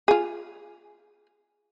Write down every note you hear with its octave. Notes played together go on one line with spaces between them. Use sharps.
F4 G#4